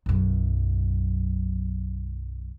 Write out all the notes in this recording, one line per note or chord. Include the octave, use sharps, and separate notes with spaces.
B1 F#2